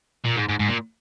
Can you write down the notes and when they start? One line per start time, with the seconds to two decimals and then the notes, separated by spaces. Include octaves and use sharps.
0.25 A#2
0.37 G#2
0.49 G#2
0.59 G#2
0.68 A#2